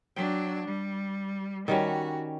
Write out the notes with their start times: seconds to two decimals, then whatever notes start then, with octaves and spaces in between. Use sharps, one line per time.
0.16 F#3 D4 G5
0.67 G3
1.68 D#3 G3 C#4 F#4